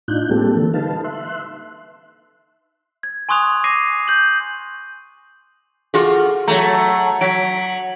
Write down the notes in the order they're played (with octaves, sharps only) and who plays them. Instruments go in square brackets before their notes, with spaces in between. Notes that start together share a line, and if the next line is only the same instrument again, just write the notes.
[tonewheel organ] A2 D4 D#4 F4 F#6 G6
G3 G#3 A#3 C4 G4 A4
D3 E3 A#3 A4
D#4 B4 F5 A5
E5 C6 F#6
[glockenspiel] G#6
G#5 C6 C#6 D#6 F#6 F7
D6 A#6 C7 D#7
G6 F#7
[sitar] F4 F#4 [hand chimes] G#4 A4
[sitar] F#3 A3 [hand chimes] A#5
[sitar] F#3 [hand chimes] B6 D7